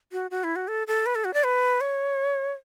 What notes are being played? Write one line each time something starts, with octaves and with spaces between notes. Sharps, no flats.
F#4
F#4
E4
F#4
A4
A4
B4
A4
F#4
D5
B4
C#5